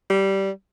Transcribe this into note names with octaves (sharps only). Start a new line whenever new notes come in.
G3